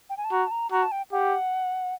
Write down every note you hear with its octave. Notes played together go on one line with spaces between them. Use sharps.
G5
G#5
A5
F#4 A#5
A5
A#5
F#4 A#5
A5
G5
G4 F#5